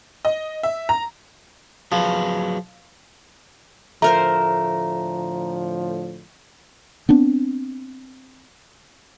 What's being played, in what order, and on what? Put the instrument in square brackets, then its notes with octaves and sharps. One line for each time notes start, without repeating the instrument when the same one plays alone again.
[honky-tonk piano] D#5
E5
A#5
[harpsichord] F3 [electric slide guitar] F#3 G#4 B4
[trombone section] A2 D3 F3 [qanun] A3 A#4 C5 [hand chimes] A#5
[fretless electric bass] B3 C4 D4